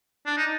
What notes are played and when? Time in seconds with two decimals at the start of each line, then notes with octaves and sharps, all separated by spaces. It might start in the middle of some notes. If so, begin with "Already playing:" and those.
0.26 D4
0.37 D#4